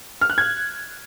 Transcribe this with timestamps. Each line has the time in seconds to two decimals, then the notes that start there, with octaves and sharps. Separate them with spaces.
0.21 F6
0.30 F#6
0.38 G#6